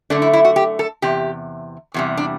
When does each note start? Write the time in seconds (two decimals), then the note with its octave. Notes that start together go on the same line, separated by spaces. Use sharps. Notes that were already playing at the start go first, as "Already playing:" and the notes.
0.10 F#2 D3 A3 D4
0.22 E4
0.33 E4
0.45 F#4
0.56 G4
0.79 A4
1.02 E2 C3 G4
1.94 E2 C3 G3
2.17 D4